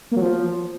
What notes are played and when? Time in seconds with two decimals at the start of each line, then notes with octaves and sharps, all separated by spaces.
0.11 A#3
0.17 F#3
0.22 F3